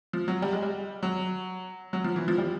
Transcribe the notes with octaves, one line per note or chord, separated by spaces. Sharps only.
F3
F#3
G3
G#3
G3
F#3
F#3
F3
E3
F3
G3